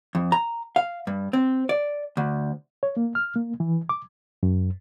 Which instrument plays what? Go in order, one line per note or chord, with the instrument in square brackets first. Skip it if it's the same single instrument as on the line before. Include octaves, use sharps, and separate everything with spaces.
[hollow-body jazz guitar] F2
A#5
F5
G2
C4
D5
D2
[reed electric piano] C#5
A#3
F6
A#3
E3
D6
F#2